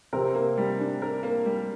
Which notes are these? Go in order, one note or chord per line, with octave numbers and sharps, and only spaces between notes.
C3 C4 A#4
A#3
G3
D4
A#4
A#3
G3